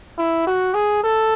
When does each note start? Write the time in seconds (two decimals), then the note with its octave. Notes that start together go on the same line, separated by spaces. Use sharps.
0.18 E4
0.47 F#4
0.74 G#4
1.03 A4